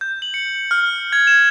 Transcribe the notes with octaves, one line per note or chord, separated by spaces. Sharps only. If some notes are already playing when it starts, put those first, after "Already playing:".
G6
F#7
C#7
F6
G#6
E7